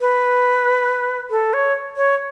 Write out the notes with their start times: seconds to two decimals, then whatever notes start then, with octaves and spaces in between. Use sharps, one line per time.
0.01 B4
1.30 A4
1.53 C#5
1.97 C#5